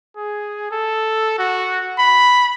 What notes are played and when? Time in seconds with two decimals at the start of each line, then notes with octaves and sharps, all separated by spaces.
0.17 G#4
0.71 A4
1.39 F#4
1.99 B5